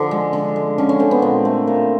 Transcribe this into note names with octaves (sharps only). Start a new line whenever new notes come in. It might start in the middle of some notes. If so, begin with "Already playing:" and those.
Already playing: D3 F3 D4
G#3
D3
G#3
D3 C#4
C#4
D3 C4
B3
A#2 C4
A3
A#2